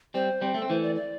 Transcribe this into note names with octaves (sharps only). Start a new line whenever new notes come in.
G3 C4 C5
G3 C4
A3 A4
C4
E3 A3 C5
D5
D5